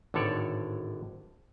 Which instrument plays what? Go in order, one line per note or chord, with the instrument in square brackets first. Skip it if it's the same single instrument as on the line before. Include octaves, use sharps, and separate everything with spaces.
[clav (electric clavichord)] G#1 A2 D3 A4 C#5 D5